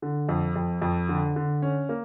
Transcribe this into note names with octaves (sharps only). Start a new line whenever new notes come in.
D3
F2
F2
F2
D3
D3
C#4
A#3